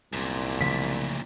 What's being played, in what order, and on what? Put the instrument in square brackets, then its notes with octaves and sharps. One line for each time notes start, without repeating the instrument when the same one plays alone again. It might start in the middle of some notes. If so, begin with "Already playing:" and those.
[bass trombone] C2 [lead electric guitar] F#2 A#2
[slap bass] C#3 F3 A3 [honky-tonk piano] B6